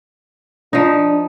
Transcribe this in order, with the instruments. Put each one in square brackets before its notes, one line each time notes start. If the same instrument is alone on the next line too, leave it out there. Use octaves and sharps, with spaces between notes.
[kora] F3 D#4 [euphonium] D4